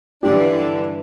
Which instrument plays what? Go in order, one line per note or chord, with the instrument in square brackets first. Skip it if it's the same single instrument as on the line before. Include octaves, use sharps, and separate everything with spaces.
[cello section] G2 D3 E3 [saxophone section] D4 [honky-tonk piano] G4